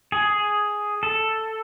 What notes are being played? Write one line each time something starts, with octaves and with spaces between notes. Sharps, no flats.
G#4
A4